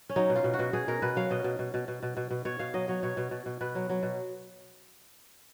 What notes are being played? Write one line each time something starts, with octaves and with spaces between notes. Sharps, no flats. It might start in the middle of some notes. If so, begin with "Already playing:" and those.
C#4
F#3 D#4
B2
F4
B2
F#4
B2
B2 G#4
B2 A#4
B2 B4
F#3 F5
B2 D#5
B2
B2
B2
B2
B2
B2
B2
B2 C#5
B2 F5
F#3 D#5
F#3 C#5
B2 C#5
B2
B2
B2
B2 B4
F#3
F#3
B2